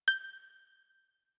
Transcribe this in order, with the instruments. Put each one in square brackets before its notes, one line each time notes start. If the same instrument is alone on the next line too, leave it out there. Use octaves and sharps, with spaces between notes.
[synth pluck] G6